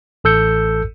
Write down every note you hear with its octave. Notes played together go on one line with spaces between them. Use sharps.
A1 A4 E6 G6 C#7